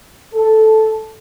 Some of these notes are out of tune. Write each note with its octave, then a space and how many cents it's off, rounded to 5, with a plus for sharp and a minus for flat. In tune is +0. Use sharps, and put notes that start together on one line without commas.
A4 -5